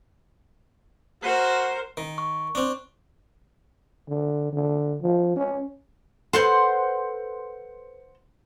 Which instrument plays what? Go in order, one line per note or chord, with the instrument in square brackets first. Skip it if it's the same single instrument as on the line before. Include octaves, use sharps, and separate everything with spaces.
[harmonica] F#4 F#5 [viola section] A#4 C5
[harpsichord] D#3
[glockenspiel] C#6
[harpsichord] C4 D4
[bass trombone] D3
D3
F3
C#4
[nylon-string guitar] A4 B4 [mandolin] C5 F#5 C6